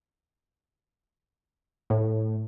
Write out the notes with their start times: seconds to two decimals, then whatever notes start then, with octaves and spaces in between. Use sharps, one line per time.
1.90 A2